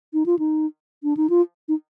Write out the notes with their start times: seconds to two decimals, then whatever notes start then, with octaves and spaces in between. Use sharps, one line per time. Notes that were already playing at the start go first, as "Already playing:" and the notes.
0.13 D#4
0.26 F4
0.39 D#4
1.03 D4
1.17 D#4
1.30 F4
1.68 D#4